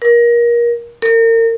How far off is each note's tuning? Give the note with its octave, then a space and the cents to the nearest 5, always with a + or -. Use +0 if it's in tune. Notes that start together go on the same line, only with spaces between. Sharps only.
A#4 +25
A#4 -35